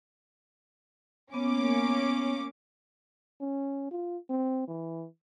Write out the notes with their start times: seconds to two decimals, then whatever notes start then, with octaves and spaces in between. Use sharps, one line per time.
1.34 A#3 B3 C#4 D6
3.41 C#4
3.91 F4
4.30 C4
4.68 E3